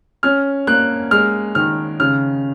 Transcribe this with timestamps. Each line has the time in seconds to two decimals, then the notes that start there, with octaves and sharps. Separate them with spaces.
0.23 C#4 F6
0.67 A#3 F#6
1.11 G#3 F6
1.55 D#3 F6
2.00 C#3 F6